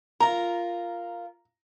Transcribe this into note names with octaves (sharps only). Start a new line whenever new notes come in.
F4 A#4 A#5